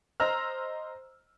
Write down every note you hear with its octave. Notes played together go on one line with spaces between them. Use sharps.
C5 D#5 A#5 E6 F6